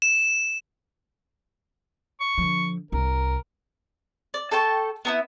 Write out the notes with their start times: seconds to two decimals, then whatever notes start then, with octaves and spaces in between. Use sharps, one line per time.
0.02 E7
2.20 C#6
2.38 D3 F3
2.92 C2 E4 A#4
4.34 D5
4.51 A4 G5 A5 C#6
5.05 B3 D#4 E4